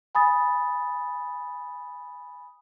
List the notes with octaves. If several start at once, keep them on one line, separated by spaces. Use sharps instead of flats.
G#5 B5 D#6 A6